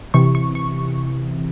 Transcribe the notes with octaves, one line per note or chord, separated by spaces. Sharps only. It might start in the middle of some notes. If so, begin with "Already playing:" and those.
C3 E3 C#6
C#6
C#6